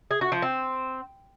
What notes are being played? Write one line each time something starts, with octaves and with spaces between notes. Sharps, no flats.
G#4
F#4
F3
C4